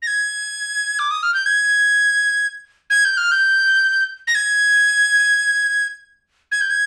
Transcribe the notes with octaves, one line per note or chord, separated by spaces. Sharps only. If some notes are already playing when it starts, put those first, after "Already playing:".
A#6
G#6
D6
D#6
F6
G6
G#6
G#6
G6
F6
G6
A#6
G#6
G#6
G6
G#6